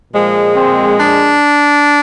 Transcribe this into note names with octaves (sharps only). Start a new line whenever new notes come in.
A#2 F3 G#3
C4
D4